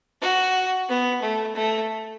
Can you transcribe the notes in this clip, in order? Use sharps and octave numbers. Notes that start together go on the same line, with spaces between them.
F#4
B3
A3
A3